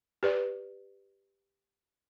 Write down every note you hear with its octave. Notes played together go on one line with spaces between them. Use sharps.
G4 B4 D5